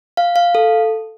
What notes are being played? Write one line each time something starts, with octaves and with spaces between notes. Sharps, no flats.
F5
F5
A4